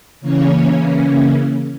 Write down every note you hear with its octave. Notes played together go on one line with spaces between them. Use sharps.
C#3 E3 A#3 C#4 C#5